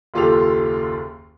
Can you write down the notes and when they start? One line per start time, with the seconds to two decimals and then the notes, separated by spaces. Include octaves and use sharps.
0.14 F#1 D#2 F4 G4 A4 F7